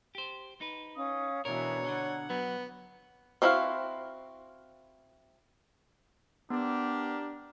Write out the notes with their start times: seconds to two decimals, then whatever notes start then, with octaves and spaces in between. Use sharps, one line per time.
0.15 G4 C5
0.61 D#4 B4
0.96 C#4 F5 D#6
1.45 B2 E3 D4 A#4 C#5 A#5 G#6
1.86 B2 D3 F#5
2.30 F#3 B3
3.42 C4 D4 E4 F#4 F5
6.50 B3 D4 G4 A#4